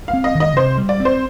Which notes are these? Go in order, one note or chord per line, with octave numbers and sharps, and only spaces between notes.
F5
C4
D#5
D#3
D#5
C3 C5
G3
D5
C4
C5